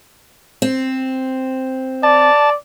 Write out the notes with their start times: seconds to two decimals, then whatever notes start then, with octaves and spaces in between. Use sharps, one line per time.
0.62 C4
2.03 D5 A5